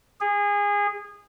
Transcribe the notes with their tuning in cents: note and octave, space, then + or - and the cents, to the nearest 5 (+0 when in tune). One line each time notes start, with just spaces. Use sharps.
G#4 -25